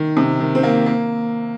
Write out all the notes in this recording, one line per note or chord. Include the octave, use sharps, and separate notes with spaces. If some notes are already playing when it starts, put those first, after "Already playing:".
Already playing: D#3
C3
D#3
C4
A#3
A#3